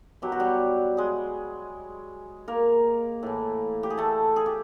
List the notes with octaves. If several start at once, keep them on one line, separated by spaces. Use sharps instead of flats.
B2 F#3 G4
F#4
G3 G4
G#3 G#4
A#3 A#4
A2 E3
G4
G#4
A3 A4
G#4
G4